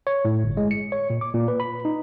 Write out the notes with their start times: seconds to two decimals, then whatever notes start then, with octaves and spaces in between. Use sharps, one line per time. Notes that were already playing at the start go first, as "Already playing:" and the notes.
0.07 C#5
0.25 A2
0.44 G1
0.57 G#3
0.71 C#7
0.92 C#5
1.10 A#2
1.21 D6
1.34 A#2
1.48 B4
1.60 B5
1.85 D#4